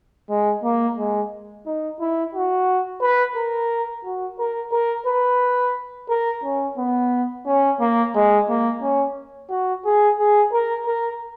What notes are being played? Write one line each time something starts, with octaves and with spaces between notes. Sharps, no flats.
G#3
A#3
G#3
D#4
E4
F#4
B4
A#4
F#4
A#4
A#4
B4
A#4
C#4
B3
C#4
A#3
G#3
A#3
C#4
F#4
G#4
G#4
A#4
A#4